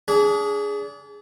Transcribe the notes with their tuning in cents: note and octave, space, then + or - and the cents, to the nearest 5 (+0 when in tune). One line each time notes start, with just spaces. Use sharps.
D4 -35 G#4 +0